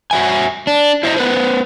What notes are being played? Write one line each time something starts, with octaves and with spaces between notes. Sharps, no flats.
F#4 E5 G#5
D4
E4 C5 D5 D#5
B3 B4 C5